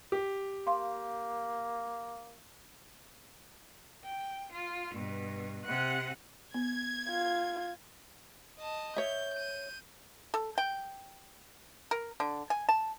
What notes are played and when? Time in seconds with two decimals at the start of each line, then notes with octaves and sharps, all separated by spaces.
0.12 G4
0.67 A#3 F5 C6
4.05 G5
4.54 F4
4.95 G2 B2
5.65 C3 F#5 F#6
6.54 B3 G#6
7.09 F4
8.60 D#5 A5
8.96 C#5 E5 G6
9.34 G6 D#7
10.34 A4
10.58 G5
11.91 A#4
12.20 D3
12.50 G#5
12.69 A5